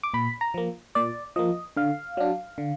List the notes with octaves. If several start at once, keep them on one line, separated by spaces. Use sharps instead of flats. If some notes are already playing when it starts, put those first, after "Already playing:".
D6
A#2 B5
A#5
F3 A#3
A#2 D5
F3 A#3 D#5
D3 F5
F#3 D4
D3